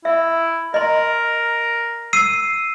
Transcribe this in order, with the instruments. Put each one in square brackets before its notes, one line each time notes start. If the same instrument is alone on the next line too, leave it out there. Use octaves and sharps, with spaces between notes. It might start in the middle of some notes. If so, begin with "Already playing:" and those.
[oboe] E4 [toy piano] E5
[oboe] A#4 [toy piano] D#5 C6
[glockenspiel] E6 C7 D#7